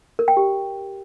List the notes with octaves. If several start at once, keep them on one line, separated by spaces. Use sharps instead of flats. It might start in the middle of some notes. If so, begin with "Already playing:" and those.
A#4
G5
G4